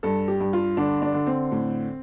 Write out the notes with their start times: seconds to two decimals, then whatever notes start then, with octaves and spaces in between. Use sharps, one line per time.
0.03 G2 A4
0.28 G4
0.40 G2
0.53 F4
0.77 D3 D4
1.02 D4
1.14 D3
1.27 C4
1.52 A2